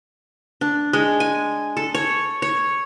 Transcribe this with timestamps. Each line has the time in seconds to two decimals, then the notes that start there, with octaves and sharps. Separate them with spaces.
0.61 D4
0.93 G#3
1.20 G#5
1.77 A4
1.95 C#5
2.42 C#5